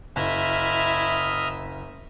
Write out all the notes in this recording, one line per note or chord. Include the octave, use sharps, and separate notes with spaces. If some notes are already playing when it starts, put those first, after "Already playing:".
F#1 E4 D#5 E5 F6